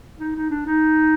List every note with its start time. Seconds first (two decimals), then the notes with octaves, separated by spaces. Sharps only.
0.19 D#4
0.36 D#4
0.50 D4
0.66 D#4